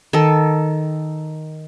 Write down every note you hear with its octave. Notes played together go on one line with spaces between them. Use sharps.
D#3 A4